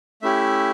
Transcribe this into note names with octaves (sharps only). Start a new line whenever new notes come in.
A3 C#4 E4 G4 E5